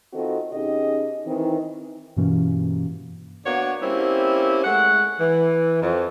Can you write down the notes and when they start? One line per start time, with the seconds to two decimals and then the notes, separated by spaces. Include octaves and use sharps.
0.13 D#3 C4 F4 F#4 A4 D#5
0.52 B2 C#4 D#4 G4 G#4 D#5
1.26 D#3 E3 C4
2.17 G2 B2 E3 A#3 C#4
3.46 A#3 B3 D4 F#4 C#5
3.82 G3 A#3 C4 C#4 E4
4.64 G#3 A3 F#5
5.20 E3
5.82 F2